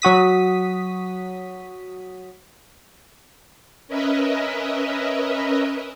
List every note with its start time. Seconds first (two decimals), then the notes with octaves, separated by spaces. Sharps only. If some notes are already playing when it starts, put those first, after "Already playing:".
0.02 F#3 F#4 D#6 B6
3.88 C#4 A#4 B4 D#5 E5